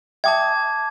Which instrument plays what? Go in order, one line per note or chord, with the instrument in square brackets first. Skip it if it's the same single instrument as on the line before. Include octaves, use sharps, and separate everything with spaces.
[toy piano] E5 G5 D#6 [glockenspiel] A5 D6 G#6